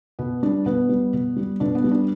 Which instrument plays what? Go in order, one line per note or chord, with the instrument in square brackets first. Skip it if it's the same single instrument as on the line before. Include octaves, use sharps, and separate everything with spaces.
[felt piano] B2 B3
G3 D4
B2 B3
G3
B2
G3
B2 D4
B3
G3
D4